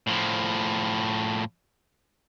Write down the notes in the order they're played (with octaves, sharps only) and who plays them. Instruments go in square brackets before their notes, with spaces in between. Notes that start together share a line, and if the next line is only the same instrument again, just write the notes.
[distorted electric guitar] A2 F3